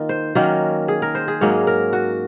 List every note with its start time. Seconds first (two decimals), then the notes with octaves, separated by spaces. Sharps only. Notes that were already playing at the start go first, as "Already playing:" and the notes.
Already playing: D#3 A#3 D#4 F4
0.09 C5
0.35 D#3 F#3 A#3 C#4 A#4
0.88 G#4
1.02 A#4
1.15 C5
1.28 G#4
1.41 G#2 F#3 A#3 C#4 C#5
1.67 A#4
1.93 F#4